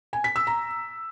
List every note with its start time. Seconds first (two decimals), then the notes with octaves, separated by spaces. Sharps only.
0.13 G#5
0.24 B6
0.36 E6
0.47 A#5